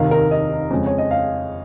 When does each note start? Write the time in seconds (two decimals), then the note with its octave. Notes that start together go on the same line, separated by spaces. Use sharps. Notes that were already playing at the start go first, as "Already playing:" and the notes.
Already playing: F1 D#2 D#3 F5
0.11 A#4
0.31 D#5
0.70 F2 C#3 G#3
0.86 C#5
0.98 D#5
1.11 F5